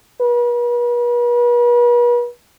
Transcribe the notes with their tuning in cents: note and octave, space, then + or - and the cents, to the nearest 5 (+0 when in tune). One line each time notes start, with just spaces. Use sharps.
B4 -40